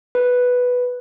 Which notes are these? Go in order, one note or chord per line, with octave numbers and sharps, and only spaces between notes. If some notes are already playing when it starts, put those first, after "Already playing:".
B4